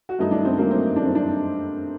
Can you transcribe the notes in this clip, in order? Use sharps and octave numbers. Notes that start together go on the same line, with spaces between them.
F#4
G2 D#3 F#3 A3 D#4
D4
C4
G2 D#3 F#3 A3 A#3
C4
G2 D#3 F#3 A3 D4
C4
D4